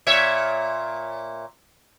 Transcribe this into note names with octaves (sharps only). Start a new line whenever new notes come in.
A#2 C#5 E5